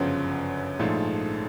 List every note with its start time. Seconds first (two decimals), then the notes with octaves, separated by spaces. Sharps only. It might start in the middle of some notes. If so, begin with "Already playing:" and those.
Already playing: G1 F#2 C#3 F3
0.79 A#1 G#2 F3 A3